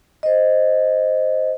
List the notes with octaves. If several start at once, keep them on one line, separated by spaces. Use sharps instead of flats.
C5 D#5